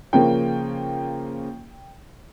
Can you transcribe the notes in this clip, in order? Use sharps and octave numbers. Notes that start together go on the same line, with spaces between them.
C#3 F3 A#3 C#4 G5